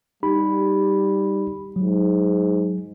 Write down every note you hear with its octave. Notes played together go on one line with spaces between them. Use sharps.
G3 D#4 G4 B5
G#2 F#3